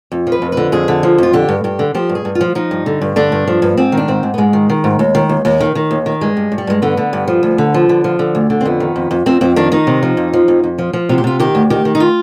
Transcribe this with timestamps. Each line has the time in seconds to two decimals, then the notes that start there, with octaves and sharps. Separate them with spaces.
0.12 F2
0.27 F3
0.32 B4
0.42 F2
0.52 D3 B4
0.72 F2 G#4
0.88 D3
1.03 F3
1.18 F2 F4
1.33 D3 G4
1.48 G2
1.64 G2 G4
1.79 D3
1.95 F3 G4
2.09 G2
2.15 G#4
2.25 G2
2.35 F4
2.41 F3
2.55 F3 D#4
2.71 G2
2.86 D3
3.01 G2
3.16 D3 D4
3.32 G2
3.48 F3
3.62 G2
3.77 G#2 C4
3.92 D#3
3.97 D4
4.08 G#2 C4
4.23 G#2
4.34 B3
4.38 G#2 G#3
4.53 D#3
4.70 D#3
4.84 G#2
4.99 D#2
5.15 D#3
5.29 D#2
5.45 D#2
5.60 D#3
5.75 D#3
5.91 D#2
6.06 D#3
6.21 G2 G#3
6.37 G2
6.52 G2
6.58 G3
6.67 G2 G#3
6.82 D3 B3
6.97 D3
7.13 G2
7.28 F3
7.43 D2
7.58 D3
7.74 F3
7.89 D3
8.04 F3
8.19 D3
8.35 D2
8.50 D3
8.61 C4
8.65 F2 B3
8.80 D#3
8.96 F2
9.11 F2
9.26 F2 C4
9.41 F2 C4
9.56 D#3 D4
9.72 D#3 D#4
9.87 C3
10.03 F3
10.17 F2
10.33 F3
10.48 F2
10.64 F2
10.79 F3
10.93 F3
11.09 C3 F4
11.18 G4
11.24 C3 F4
11.40 D#3 G4
11.55 D2
11.70 D#3 G4
11.85 D#3
11.95 D#4
12.00 F4